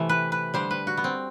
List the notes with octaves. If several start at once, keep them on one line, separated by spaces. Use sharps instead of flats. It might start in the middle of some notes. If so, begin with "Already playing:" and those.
Already playing: C3 E3 A3
B4
B4
D3 G3 C5
B4
F#4
B3
C4